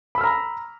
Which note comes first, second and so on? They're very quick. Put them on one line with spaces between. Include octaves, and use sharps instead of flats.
B5 E6 F6 A#5